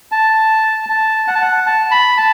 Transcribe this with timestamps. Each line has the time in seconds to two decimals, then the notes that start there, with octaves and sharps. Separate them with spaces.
0.12 A5
0.89 A5
1.28 F#5
1.35 A5
1.42 F#5
1.66 A5
1.91 B5
2.17 A5